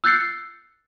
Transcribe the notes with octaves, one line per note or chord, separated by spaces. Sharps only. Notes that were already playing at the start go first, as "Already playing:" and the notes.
E6 F#6 G6 A6 C7 C#7